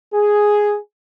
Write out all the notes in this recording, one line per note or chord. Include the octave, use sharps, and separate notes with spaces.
G#4